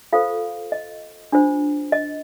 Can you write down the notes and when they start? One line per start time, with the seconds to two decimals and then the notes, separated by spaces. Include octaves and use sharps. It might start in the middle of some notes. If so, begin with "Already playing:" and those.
0.13 F4 A4 C5 F5
0.72 D#5
1.32 D4 F4 C5
1.92 D#5